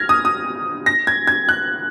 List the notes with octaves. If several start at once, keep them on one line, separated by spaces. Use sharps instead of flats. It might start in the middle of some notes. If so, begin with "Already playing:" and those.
Already playing: F6 G#6 A#6
D#6
D#6
A#6
G#6
G#6
F#6